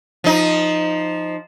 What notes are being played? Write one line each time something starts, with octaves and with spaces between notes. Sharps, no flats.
F3 D#4